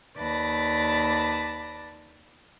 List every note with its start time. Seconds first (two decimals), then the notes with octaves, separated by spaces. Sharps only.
0.16 D#2 B4 D5 A5 A#6